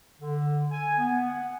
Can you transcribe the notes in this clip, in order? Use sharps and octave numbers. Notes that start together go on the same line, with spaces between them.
D3
G#5
B3
F#5